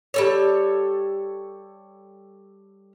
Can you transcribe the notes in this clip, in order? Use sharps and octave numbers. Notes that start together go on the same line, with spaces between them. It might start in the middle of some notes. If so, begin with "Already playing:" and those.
G3 A4 C#5